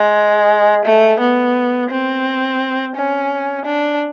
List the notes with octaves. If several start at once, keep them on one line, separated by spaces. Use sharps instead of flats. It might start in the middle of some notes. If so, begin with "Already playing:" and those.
Already playing: G#3
A3
B3
C4
C#4
D4